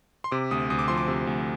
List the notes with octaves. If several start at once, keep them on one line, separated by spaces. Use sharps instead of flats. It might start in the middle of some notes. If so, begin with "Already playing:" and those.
C6
C3 D6
D2 D#6
D2 D#6
D6
F3 C6
D6
C3
D2